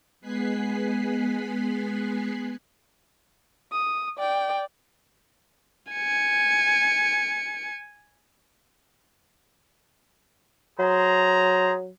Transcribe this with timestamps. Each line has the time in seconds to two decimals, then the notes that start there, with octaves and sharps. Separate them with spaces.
0.21 G#3 B3 G#5 F#6 B6 C7
3.72 D#6
4.18 D5 G5
5.92 G#5 C#7
10.79 F#3 G#4 C5 A#5